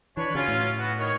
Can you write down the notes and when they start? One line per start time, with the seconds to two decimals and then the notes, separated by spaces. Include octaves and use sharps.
0.17 E3 D4 B4 C#5
0.35 C#3 F#3 C#4 F4
0.48 A2
0.78 B3 F#4
0.99 D#3 C#5